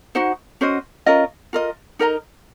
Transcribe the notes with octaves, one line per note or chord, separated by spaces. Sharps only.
D#4 F#4 C5 F#5
C#4 F#4 C5 D#5
C#4 F4 A#4 D#5
F4 A#4 D#5
D#4 A#4 D#5 A#5